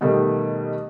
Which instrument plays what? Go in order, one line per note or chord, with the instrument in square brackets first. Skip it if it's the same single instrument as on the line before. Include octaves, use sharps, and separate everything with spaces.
[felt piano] B2 D#3 G3 A3